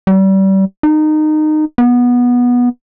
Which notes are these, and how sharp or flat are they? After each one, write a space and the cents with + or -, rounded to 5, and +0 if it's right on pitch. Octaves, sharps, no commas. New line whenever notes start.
G3 -30
D#4 -20
B3 -15